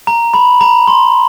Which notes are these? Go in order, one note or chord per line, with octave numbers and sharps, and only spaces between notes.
A#5
B5
A#5
C6